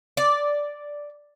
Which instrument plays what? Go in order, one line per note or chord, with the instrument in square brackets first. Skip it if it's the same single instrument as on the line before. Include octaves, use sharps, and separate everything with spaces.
[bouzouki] D5